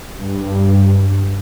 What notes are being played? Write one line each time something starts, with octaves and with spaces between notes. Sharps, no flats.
G2